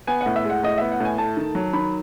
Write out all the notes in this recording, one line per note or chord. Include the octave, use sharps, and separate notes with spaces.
B3 G#5
F#5
A2
E5
G#3
F#5
A2 D#5
B3 E5
F#5
A2 G#5
A3 A5
D#3
F#3
D#3 B5